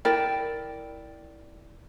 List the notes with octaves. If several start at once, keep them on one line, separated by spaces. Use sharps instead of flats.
E4 A#4 D5 G5